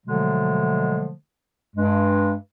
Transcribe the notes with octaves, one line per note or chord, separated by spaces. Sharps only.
B2 D3 F3 F#3 G#3 A3
G2 G#3